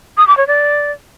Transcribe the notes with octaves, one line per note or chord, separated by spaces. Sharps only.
D#6
D6
C#5
D5